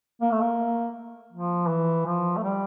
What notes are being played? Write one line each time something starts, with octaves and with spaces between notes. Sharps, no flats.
A#3
A3
A#3
F3
E3
F3
A3
G3